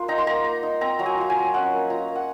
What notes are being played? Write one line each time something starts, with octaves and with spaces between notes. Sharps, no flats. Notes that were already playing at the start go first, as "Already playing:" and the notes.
Already playing: A#3 F4 F#5
D#4 A#5
C6
A#3 A#5
A#3
D#4
C4 A#5
F#3 A#5
G#5
F4 A#5
G#5
F#3
C#4 F#5
A#3
F4 A#5
A#3
F#5